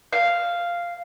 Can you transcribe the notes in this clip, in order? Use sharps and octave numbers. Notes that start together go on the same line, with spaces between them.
F5